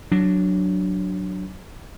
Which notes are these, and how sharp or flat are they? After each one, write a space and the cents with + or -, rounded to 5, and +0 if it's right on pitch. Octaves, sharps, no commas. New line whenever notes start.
F#3 +0 D4 +0